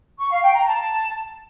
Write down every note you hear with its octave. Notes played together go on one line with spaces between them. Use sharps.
C#6
F5
G5
A#5
A5